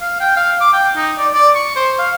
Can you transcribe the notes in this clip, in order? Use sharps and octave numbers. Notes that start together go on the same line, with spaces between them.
F5
G5
F5
D6
G5
D#4
D5
D5
C#6
C5
F5